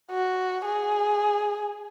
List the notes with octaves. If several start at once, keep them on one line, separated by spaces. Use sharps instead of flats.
F#4
G#4